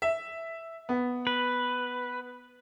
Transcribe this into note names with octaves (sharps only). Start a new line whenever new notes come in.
E5
B3
B4